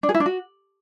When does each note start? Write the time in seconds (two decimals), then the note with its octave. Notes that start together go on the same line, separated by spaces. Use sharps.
0.03 D4
0.09 G#4
0.14 E4
0.20 D4
0.26 F#4